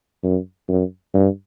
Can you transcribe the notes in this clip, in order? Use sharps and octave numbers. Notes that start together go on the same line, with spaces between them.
F#2
F#2
G2